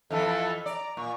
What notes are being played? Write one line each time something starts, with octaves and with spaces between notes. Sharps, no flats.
F2 E3 F3 A4
D5 A#5
A#2 C#6